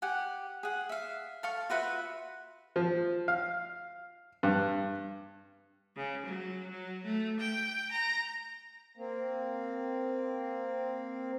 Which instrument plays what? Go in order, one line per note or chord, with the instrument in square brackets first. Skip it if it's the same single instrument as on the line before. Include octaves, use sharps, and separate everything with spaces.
[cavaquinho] G4 F#5 G#5
G#4 F#5
E5 F5
A4 F5 C#6
F4 F#4 B4 E5
[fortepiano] F3
F5
G2
[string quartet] C#3
F#3
F#3
A3
G5
A#5
[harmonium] A#3 C4